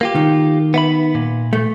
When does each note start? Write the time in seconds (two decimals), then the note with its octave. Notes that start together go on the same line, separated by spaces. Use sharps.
0.01 A#3 F4 G4
0.16 D#3
0.74 B3 E5 B5
1.15 A#2
1.53 A3